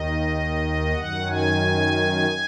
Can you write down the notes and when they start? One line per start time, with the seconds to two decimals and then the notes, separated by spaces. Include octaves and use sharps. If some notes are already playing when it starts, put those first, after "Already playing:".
Already playing: D#2 D#3 D#5
0.93 F#2 D#3 F#5
1.28 G#5